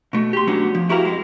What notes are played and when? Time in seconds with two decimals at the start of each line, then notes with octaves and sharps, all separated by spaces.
0.13 B2 A3
0.33 G4 C6
0.47 F#3 A3 B3 C#4 D4
0.75 F3
0.89 E4 F#4 G4 A#4 B4 F5
1.05 F2 G#3